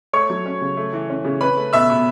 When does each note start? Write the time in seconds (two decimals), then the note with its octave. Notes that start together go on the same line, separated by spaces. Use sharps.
0.13 A3 C#5 C#6
0.30 F#3
0.46 C#4
0.61 C#3
0.77 A3
0.93 E3
1.10 C#4
1.25 C#3
1.41 C#4 B4 B5
1.57 A3
1.73 B2 E5 E6
1.90 B2